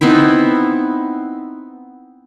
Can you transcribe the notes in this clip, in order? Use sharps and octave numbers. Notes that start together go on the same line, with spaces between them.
B3 C4 D#4 E4